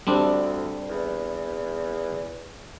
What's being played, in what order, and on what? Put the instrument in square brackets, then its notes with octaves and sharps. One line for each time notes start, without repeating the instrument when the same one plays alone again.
[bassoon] D2 [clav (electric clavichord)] G3 C4 D4
[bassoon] E2